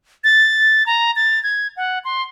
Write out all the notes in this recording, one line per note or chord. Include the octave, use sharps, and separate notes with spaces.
A6
A#5
A6
G#6
F#5
C6